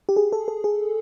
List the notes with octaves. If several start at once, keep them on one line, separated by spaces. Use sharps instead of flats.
G4
G#4
A4
A4
G#4